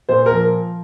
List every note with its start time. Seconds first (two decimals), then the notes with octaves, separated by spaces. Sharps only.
0.09 A#2 C5
0.26 A#4
0.31 F3